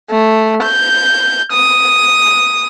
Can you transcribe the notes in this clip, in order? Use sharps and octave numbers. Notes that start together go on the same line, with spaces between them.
A3
G6
D#6